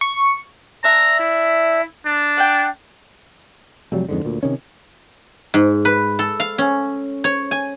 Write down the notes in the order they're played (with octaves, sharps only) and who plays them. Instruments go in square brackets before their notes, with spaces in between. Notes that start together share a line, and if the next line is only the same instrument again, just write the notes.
[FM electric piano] C#6
[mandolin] D4 E5 [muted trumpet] A#5
[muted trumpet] E4
D4
[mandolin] F#5 G5
[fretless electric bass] F1 F2 F#3 G3
F2 G#2 D3
D2 A#2
C3 D#3 C#4
[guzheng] G#2
B4
A4
F5
C#4
C#5
G#5